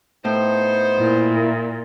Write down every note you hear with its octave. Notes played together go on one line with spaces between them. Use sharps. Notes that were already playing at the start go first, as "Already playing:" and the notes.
A2 B3 D#4 C5
A#2 E4